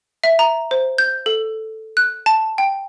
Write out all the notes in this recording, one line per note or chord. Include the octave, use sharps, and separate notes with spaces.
E5
A#5
C5
G6
A4
F#6
A5
G5